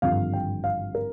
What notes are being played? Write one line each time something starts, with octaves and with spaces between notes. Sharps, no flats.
G#1 G2 D3 F3 F5
G5
F5
A#4